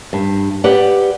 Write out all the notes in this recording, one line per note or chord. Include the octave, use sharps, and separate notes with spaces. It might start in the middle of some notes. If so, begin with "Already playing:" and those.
G2
G4 B4 D5 F#5